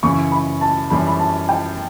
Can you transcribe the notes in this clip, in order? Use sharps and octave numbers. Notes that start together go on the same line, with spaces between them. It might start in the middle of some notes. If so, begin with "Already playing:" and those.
F#2 C#3 E3 C#6
B5
A5
F#2 E3 G3 B5
B5
A5
G5